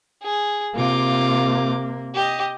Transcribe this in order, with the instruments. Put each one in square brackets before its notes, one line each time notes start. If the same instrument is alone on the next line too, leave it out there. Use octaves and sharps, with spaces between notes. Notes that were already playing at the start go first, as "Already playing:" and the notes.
[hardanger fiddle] G#4
[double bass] C3 A#3 [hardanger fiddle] F4 D6
[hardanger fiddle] G4 D#5